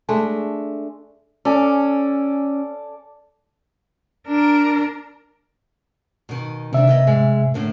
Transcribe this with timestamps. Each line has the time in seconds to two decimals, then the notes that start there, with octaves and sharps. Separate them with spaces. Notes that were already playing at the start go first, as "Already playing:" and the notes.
0.09 G#3 A3 D4
1.45 C#4 A4 D5 G#5
4.27 D4 A#4
6.29 B2 D#3
6.73 C3 D#3 D4 E5
6.87 A#3 B3 D#5
7.07 G#2 G#3
7.54 A2 D3 A#3